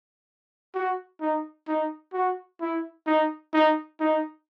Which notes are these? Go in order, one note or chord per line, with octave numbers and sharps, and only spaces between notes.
F#4
D#4
D#4
F#4
E4
D#4
D#4
D#4